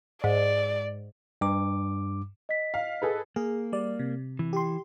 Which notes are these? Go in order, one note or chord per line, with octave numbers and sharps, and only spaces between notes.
G#2 D5
G2 D6
D#5 B6
F5
G#4 A4 B4
A#3 G#4
G3 D5
C3
E3
G4 C6